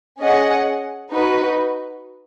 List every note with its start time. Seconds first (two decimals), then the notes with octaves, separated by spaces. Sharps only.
0.21 C#4 G#4 D#5 F#5
1.13 D#4 F#4 B4